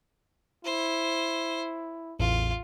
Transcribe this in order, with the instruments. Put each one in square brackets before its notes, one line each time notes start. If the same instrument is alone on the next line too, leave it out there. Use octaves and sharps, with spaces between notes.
[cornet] E4 [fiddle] C5
[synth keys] A1 E2 A2 [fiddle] F4